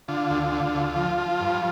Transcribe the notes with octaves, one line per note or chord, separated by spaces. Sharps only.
D3 F4
D2
D3
D2
F3
F3
G2